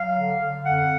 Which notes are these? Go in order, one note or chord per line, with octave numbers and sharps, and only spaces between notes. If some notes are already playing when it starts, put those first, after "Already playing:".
Already playing: F#3 F5
D3
D3
F2 F#5